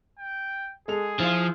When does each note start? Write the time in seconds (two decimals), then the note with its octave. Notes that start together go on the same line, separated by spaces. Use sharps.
0.19 G5
0.88 G#3 G#4 A4 F7
1.20 F3 E4 F4